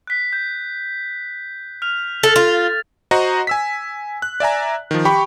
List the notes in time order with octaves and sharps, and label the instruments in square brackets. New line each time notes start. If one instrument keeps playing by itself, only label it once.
[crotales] F#6 B6
G6
F6 F7
[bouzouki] A4 [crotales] F6 A6
[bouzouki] F4
[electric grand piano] F#4 C5 D#5 F#5 A#5
G#5 E6 B6
F#6
D5 E5 G#5 A#5
D#3 F3
G4 G5 B5 C#6